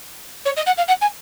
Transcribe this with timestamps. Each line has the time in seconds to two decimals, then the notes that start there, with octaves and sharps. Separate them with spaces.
0.45 C#5
0.57 D#5
0.66 F#5
0.77 F5
0.88 F#5
1.01 G#5